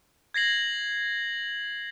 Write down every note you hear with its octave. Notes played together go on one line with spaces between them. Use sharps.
G#6 A#6 C7 F#7